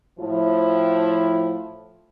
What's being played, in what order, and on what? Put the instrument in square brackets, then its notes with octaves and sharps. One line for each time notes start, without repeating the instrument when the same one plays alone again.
[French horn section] A2 F3 E4